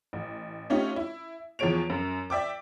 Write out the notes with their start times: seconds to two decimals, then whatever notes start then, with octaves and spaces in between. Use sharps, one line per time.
0.13 A1
0.70 A3 C#4 D#4 F4 G4
0.96 E4
1.59 E2 F3 G#4 C#5 D7 F7
1.90 F#2
2.30 D5 E5 G5 D6